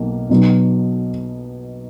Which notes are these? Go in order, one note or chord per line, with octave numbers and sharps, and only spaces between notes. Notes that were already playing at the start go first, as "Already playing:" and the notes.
Already playing: B1 B2 A#3
B1 B2 F#3 B3